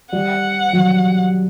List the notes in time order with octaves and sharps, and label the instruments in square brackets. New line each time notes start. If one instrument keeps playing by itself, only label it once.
[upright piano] G3 [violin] F#5
[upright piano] F#3